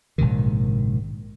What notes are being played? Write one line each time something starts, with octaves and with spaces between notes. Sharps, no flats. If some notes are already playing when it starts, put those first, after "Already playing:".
A#1 G#2 C3 D#3